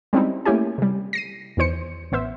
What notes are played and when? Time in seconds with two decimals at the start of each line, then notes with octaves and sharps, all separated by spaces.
0.13 G3 G#3 C4 C#4 D#4 E4
0.45 A3 A#3 C#4 E4 G4 G#5
0.78 C3 G3
1.13 A#6 C7 D#7
1.57 E2 D#3 E3 C5 C#7
2.12 A1 B3 C5 E5